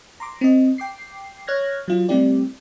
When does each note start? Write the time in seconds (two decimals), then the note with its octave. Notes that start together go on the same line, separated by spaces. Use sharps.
0.20 A#5 C6 D6
0.41 C4 D#5
0.78 G5 D6 C7
1.47 C#5 F6 F#6 G#6 A#6
1.88 F#3 F4
2.09 G3 A3 C4 E4 G4 D5